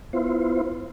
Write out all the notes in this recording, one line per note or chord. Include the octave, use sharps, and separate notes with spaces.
B3 E4 F4 C5